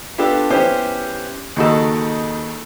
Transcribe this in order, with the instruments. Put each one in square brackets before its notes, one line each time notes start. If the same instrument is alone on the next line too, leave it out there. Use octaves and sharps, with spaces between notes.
[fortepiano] B3 D4 F4 G4 A4
B3 C#4 E4 G4 C5
D#2 C#3 D#4 F#4 A4